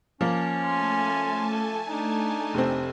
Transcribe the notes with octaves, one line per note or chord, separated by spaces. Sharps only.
F3 A#3 C#4
A3 G#5 A5 C6
A4
D4 D#4
F1 C4